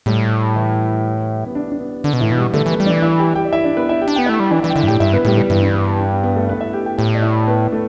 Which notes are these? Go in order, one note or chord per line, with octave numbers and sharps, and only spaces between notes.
A2 G3 G4
E3 E4
B3
D4
D4
B3
D3 D4
B2
A2 E3 E4
B2
G3 G4
D3 A3 A4
E3
B3 B4
G3
E3 D4 D5
E4 E5
G4 G5
G4 G5
D5
E4 E5
D4 D5
B3 B4
E4 E5
G4 G5
D4
B3 G5
A3 E4 E5
G3
E3 D4 D5
E3 E4 E5
G5
D3 E4 E5
G2
A2 G4 G5
G2 E4 E5
B3 B4
A2 G3 G4
G3 G4
G2 E3 E4
D4
B3
B3
D4
B3
B3
A3 A4
B3 B4
E4 E5
G4 G5
G4 G5
A2 G4 G5
D5
E4 E5
B3 B4
A3 A4